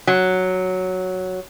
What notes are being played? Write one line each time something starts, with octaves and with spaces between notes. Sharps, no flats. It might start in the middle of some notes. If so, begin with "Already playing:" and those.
F#3